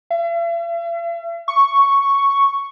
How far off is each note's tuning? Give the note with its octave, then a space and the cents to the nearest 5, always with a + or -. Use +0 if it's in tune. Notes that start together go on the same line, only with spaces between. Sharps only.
E5 +45
C#6 +0